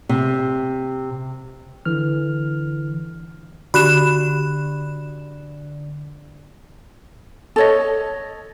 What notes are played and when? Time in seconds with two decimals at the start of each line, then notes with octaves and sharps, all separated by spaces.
0.09 C3
1.85 D3 E3 F6
3.74 D3 F#4 G4 B5 F#6 E7
7.56 A4 C#5 D#5